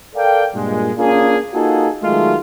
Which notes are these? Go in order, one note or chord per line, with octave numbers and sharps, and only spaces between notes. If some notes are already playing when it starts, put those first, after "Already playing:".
A4 A#4 D5 F5 G5
G2 A#2 G#3
A#3 C#4 D4 F4 G#4
A#3 D#4 F4 F#4 G#4 A4
D#3 F#3 G#3 A3 F4